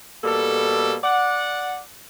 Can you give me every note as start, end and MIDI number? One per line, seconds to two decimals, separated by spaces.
0.23 0.95 47
0.23 0.95 55
0.23 0.95 58
0.23 0.95 69
1.03 1.80 74
1.03 1.80 78